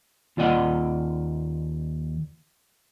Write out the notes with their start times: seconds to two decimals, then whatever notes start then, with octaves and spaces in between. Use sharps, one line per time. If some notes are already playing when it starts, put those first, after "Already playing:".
0.37 D#2 F4 D5 D#5 F#5